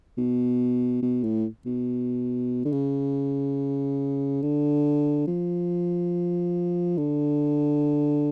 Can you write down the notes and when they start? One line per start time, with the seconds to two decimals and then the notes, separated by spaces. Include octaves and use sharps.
0.18 B2
1.02 B2
1.23 A2
1.66 B2
2.65 D3
2.72 C#3
4.42 D3
5.27 F3
6.97 D3